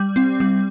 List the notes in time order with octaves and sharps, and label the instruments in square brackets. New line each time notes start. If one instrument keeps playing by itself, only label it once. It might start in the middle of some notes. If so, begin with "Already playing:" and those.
Already playing: [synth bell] G3
C4
G3